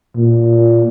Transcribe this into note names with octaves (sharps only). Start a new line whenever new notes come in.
A#2